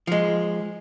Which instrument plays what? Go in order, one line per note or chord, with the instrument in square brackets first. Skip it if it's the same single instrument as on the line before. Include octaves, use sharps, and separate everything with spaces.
[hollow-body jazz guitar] F3 G#3